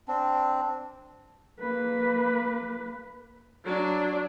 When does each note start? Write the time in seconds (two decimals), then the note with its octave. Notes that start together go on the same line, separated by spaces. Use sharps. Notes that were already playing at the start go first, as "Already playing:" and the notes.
0.08 C4 D4
1.60 A#3 B4
3.64 F#3 D4